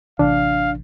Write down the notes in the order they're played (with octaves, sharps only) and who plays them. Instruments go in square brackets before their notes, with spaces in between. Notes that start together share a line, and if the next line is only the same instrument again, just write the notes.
[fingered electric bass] A1 C3 E3 [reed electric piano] D4 [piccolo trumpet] F5